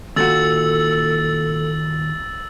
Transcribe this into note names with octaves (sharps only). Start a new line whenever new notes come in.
D#2 A#2 F#4 A4 E6 A6 F#7